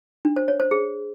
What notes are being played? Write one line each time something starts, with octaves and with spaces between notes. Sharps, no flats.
D4
C5
C#5
C5
G#4